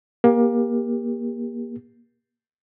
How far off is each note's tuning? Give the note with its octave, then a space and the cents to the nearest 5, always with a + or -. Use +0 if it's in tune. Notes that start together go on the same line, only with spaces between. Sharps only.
A#3 +25 G4 +30